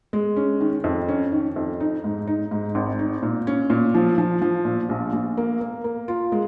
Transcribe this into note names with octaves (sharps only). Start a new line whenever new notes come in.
G#3
C#4
D#3
F2
C#4
D#3
F2
D#4
G#2
D#4
G#2
G#1
D#4
A#2
C#4
A#2
F3
F3
F3
A#2
A#1
A#1
A#3
A#3
A#3
F4
G#3